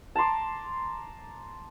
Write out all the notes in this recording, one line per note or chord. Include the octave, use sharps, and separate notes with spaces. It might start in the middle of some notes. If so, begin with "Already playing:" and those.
A5 A#5 C6 D6